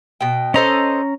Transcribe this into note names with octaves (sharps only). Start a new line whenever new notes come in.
B2 G5
C#4 A4 C5 D#5 A#5